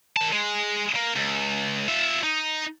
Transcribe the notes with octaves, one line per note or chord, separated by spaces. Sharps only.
D#3 A5
G#3
A#3
C#2
F4 E5
D#4